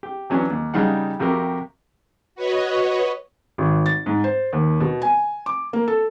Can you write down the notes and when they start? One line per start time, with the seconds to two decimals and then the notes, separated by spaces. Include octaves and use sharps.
0.03 G4
0.30 E3 F#3 C#4 D4
0.50 D#2
0.74 C#3 G3 D#4 F5 F#5
1.19 F2 C3 F#4 G4 A#4
2.35 F#4 B4 C#5 D#5
3.58 G#1
3.86 A6
4.06 G#2
4.24 C5
4.53 D#2
4.80 B2
5.02 G#5
5.46 D6
5.73 A#3
5.88 A4